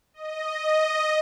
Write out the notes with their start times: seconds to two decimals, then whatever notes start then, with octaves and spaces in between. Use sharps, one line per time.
0.14 D#5